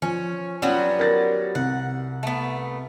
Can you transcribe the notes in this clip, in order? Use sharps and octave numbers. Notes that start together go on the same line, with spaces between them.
F3 C#4
F#3 G3 B3 C#4 F4
A#4 A6 A#6
C2 F#5
A3 B3